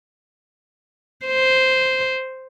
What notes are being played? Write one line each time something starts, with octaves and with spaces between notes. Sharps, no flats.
C5